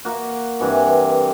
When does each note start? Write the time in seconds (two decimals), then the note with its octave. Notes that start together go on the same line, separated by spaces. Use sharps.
0.05 A#3 F#4
0.60 G2 C3 E3 F#4